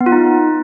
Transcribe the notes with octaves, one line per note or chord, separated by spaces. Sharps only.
B3
F4
D#4